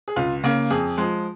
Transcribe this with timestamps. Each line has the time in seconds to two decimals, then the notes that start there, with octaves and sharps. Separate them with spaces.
0.08 G#4
0.16 C#2 F4
0.44 C#3 A#3
0.71 F2 G#4
0.97 F3 G#3